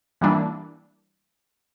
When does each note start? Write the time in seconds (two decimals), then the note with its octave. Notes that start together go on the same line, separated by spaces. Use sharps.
0.21 E3 G3 A#3 D4 E4